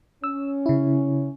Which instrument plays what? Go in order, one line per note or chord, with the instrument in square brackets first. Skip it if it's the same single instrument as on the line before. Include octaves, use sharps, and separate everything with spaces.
[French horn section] C#4 [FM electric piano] E6
[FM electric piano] C#3 E4